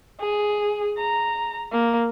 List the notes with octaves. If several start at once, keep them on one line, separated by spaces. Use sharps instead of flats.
G#4
A#5
A#3